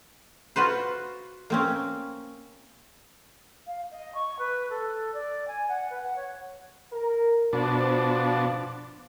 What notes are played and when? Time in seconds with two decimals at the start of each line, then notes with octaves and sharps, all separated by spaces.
0.56 F4 F#4 B4 C5
1.50 A#3 C4 C#4
3.67 F5
3.92 D#5
4.15 C#6
4.39 B4
4.70 A4
5.14 D5
5.48 G#5
5.69 F#5
5.90 B4
6.03 F#5
6.16 C#5
6.92 A#4
7.53 B2 F3 D4